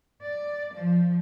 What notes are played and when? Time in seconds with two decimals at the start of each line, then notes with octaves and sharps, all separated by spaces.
0.22 D5
0.74 F3